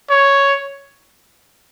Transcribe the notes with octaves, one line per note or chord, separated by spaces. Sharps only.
C#5